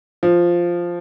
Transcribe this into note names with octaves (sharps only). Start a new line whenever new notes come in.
F3